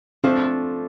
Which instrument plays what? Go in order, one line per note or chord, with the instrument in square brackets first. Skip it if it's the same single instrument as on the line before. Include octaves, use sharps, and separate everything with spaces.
[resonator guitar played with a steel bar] F3 A3 D4 [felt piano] C4